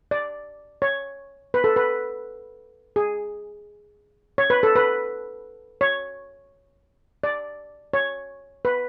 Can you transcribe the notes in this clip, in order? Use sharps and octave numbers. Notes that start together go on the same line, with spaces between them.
D5
C#5
B4
A4
B4
G#4
C#5
B4
A4
B4
C#5
D5
C#5
B4